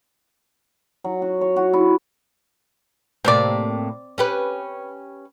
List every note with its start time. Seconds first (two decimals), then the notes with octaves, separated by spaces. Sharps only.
1.04 F#3
1.22 F#4
1.41 C#5
1.56 F#4
1.73 E4
3.25 A2 C3 A#3 C4 D5
4.18 C#4 G4 B4